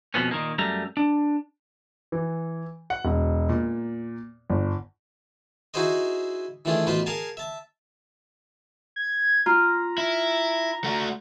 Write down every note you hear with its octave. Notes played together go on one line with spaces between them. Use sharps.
F2 B2 F3 B3 C#4
A#2 D#3 A#3
F#2 G3 A3 A#5
D4
E3
F#5
E1
A#2
G1
D#4 E4 F#4 G#4 C5 D#5
D#3 E3 A3 D4 F4 G#4
A1 B2 F4 B4 C5 C6
G#4 A#4 F5 G#5 A5
E5 A5
G#6
F4 A#5
E4
A3 F#4